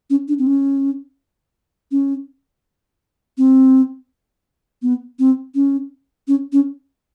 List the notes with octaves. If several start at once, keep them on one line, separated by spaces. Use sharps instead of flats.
C#4
D4
C4
C#4
C#4
C4
B3
C4
C#4
C#4
C#4